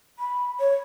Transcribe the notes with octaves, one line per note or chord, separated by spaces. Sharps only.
B5
C#5